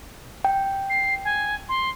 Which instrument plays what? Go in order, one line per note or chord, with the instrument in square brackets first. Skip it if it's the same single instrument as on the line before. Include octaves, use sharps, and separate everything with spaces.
[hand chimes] G5
[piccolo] C7
G#5
C6